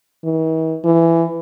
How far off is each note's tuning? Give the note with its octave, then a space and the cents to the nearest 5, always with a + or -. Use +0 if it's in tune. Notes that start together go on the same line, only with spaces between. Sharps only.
E3 -45
E3 +15